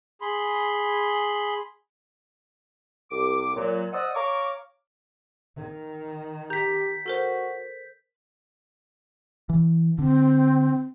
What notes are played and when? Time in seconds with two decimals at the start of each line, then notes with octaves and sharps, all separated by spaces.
0.21 G#4 B5 C6
3.11 C2 D6
3.56 A#2 F#3
3.93 C5 D5 D#5 F#5 D#6 E6
4.15 C#5 F5 A#5 C#6 D6
5.56 D#3
6.50 G4 A#5 G6 B6
7.06 F#4 A4 A#4 C5
9.49 E3
9.99 D3 C4